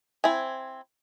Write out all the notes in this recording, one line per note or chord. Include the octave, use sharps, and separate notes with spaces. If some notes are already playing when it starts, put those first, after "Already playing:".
C4 E4 G#5